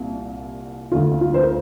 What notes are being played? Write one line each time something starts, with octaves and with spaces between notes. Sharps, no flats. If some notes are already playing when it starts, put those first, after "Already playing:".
Already playing: C2 A#2
D2 D3 F4
F4
C5
A#4